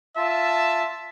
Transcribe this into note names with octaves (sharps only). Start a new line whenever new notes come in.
F4 E5 A5